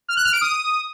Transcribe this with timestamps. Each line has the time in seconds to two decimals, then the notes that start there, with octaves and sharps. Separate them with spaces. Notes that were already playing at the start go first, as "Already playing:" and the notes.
0.08 F6
0.17 F#6
0.25 F6
0.33 D7
0.41 D#6